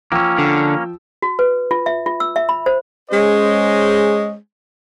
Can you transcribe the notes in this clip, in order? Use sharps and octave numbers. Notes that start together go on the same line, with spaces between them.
F3 A#3 C#4 G5 E6
D3
F#4
B4
F4
E5
F4
E6
E5
B5
C5
G#3 C#4 G#4 C5 C#5 D#5